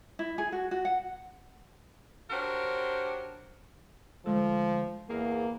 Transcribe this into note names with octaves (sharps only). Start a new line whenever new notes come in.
E4
G#4
F#4
F#4
F#5
D4 F#4 G4 A#4 C5 C#5
D2 F3 G#3 A4
E2 A#3 G#4 A#5